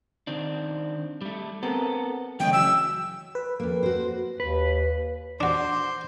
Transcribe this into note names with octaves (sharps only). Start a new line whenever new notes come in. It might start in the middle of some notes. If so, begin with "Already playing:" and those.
D#3 C4 D4
G3 A3
B3 C4 A4 A#4
F#2 C#3 E3 A3 D#5 G5
E3 F#4 E6
B4
F2 A#3
F#4 C5
D#2 B4
D4 F#4 C5 D6